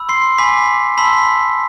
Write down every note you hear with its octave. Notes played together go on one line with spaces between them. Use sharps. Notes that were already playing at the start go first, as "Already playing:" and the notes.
Already playing: B5 E6
C6 C7
G#5 B5 D6 B6
A5 B5 C6 E6 B6